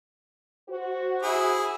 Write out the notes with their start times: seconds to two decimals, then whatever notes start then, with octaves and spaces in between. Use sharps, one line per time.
0.69 F#4 C5
1.23 E4 G#4